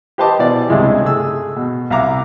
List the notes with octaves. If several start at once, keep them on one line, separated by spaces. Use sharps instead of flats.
G4 B4 C5 D#5 A5 D6
B2 E3 D5
C#2 G2 C3 G#3 E4
A3 G#4 E6
B2
C2 E5 F5 A#5 D6